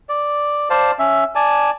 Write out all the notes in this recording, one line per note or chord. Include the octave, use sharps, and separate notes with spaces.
D5
C5 D5 F5 A5
C#4 E5
D5 G#5 A5